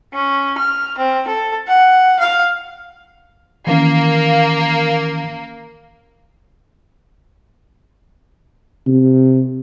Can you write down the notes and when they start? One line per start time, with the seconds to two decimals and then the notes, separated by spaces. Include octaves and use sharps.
0.13 C#4
0.58 F6
0.98 C4
1.27 A4
1.68 F#5
2.19 F5
3.67 D#3 E3 A#3 C#4
8.87 C3